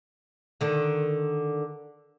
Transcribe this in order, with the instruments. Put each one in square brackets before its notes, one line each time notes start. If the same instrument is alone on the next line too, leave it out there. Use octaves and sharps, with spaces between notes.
[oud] D3 D#3